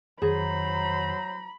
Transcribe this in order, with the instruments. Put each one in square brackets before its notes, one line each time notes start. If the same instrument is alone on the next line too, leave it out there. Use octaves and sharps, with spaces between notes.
[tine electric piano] F2 D#3 [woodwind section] F#3 C5 A#5 [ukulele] G#4 [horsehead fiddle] B5